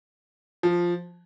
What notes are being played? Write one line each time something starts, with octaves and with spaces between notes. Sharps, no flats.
F3